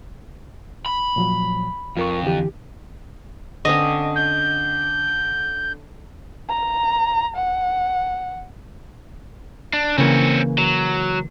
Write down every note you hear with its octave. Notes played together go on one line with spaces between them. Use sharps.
B5
A#2 F3 F#3
F2 F4 A#4 C#6
D3 E3 G4
D3 C4 C#4 D#5
G6
A#5
F#5
D4
C#3 E3 A#3 C4 C#5
F#3